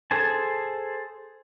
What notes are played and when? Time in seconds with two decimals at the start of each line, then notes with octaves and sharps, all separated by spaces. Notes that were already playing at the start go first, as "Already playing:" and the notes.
0.11 G#4 A4 C5 G#5 A5